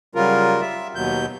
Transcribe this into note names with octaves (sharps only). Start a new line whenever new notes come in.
C#3 F#3 G3 F4 A#4
E5
D#2 B2 F#3 G6